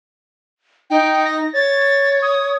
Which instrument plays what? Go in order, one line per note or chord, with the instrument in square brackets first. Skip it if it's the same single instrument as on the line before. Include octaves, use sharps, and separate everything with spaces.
[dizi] D#4 [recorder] G5
[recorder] A#6
[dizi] C#5 [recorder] A6
[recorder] D#6